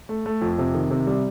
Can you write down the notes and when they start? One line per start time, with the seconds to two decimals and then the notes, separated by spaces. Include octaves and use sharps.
0.09 A3
0.26 A3
0.42 F2
0.58 C3
0.74 D#3
0.91 C3
1.07 G3